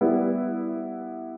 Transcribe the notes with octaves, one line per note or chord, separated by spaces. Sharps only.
G3 B3 E4